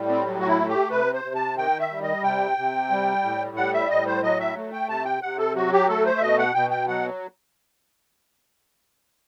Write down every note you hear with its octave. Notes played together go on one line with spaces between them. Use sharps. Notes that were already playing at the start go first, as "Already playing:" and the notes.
Already playing: A2 G3
C4
F#3
F#4
E4
A3
G4
C3 B4
C5
C3
A5
D#3 G5
E5
G3
D#5
C3 G5
C3
G3
A2
G3 F#5
E5
A2 D#5
C5
F#3 D#5
E5
A3
G5
C3 A5
G5
C3 F#5
A4
F#3 F#4
G4
A3 A4
C5
E5
B2 D#5
F#5
B2 G5
G5
F#3 F#5